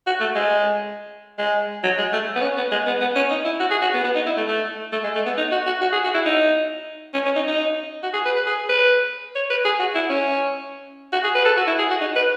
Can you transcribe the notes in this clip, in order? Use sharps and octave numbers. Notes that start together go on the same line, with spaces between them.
F#4
A3
G#3
G#3
F#3
G#3
A3
B3
C#4
B3
G#3
B3
B3
C#4
D#4
E4
F#4
G#4
F#4
B3
B3
D#4
E4
A3
A3
A3
G#3
A3
B3
D#4
F#4
F#4
F#4
G#4
F#4
E4
D#4
C#4
C#4
D#4
D#4
F#4
G#4
B4
B4
G#4
B4
C#5
B4
G#4
F#4
E4
C#4
F#4
G#4
B4
A4
F#4
E4
G#4
F#4
D#4
B4